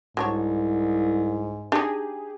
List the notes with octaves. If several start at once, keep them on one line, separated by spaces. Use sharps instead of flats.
C2 G#2 F#3 D4 C#5
D4 D#4 G4 G#4